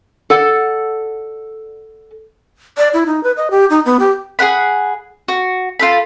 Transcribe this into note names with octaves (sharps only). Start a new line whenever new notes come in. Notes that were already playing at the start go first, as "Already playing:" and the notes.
A4 D5 F#5
D5
E4
D#4
B4
D#5
G4
D#4
B3
G4
G#4 A#4 F#5 B5
F#4
F4 A4 B5